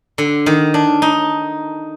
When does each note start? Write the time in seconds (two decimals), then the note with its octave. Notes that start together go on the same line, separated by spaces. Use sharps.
0.18 D3
0.46 D#3
0.74 D4
1.02 D#4